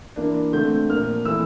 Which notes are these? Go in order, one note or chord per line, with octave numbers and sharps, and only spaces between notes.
E3 A#3 D4
D3 A3 C4 G6
A#2 F3 A#3 F6
E3 A3 C4 E6